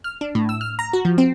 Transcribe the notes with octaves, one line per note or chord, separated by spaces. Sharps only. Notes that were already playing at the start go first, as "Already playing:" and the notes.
F6
D4
A2
E6
F6
A#5
F#4
F3
C4